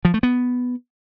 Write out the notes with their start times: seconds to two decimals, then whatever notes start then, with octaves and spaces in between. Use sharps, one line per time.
0.05 F3
0.14 A3
0.23 B3